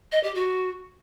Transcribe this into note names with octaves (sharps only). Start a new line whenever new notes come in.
D#5
G4
F#4